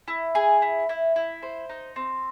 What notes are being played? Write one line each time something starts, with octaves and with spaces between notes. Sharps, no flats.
E4
G#4
E4
E4
E4
C5
D#4
C4